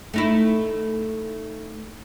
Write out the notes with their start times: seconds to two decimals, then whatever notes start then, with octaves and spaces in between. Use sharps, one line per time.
0.14 A3 D#4 E4